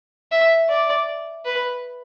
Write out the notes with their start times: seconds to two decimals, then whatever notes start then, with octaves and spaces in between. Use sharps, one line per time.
0.32 E5
0.69 D5
1.45 B4